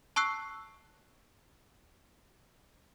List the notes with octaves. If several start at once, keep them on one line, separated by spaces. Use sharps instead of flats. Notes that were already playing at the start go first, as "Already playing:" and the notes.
A5 C#6 E6 F#6 C7